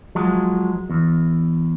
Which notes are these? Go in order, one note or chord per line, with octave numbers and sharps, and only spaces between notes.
F3 F#3 G#3
E2